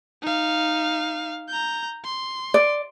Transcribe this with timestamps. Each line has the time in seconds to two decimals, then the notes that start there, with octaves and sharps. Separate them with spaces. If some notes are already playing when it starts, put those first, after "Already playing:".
0.22 D#4 F5
1.48 A#5 G6
2.05 C6
2.54 D5